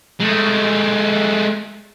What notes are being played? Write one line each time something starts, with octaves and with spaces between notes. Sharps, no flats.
G#3 A3